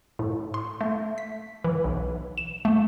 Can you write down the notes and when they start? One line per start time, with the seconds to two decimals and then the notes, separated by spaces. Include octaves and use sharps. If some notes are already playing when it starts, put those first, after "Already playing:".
0.19 A2
0.54 C6
0.81 A3
1.18 B6
1.64 E3
1.84 B1
2.38 E7
2.65 A3